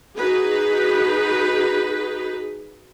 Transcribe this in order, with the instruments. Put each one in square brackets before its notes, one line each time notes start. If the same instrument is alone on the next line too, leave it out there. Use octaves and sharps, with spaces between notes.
[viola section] D#4 F#4 G#4 B4